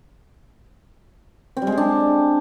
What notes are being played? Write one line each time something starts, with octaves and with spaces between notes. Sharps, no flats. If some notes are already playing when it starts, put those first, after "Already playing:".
C4
G3
G#3
G#4
D4